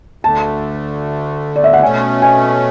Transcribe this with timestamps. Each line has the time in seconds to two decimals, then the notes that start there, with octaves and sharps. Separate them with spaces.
0.23 D2 D3 A3 A5
1.56 D5
1.64 E5
1.73 F#5
1.82 B2 A3 C#4 G#5
2.22 G#5